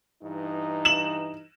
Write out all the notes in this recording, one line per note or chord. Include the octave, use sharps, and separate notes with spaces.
G2 E3 D#4
E7 F#7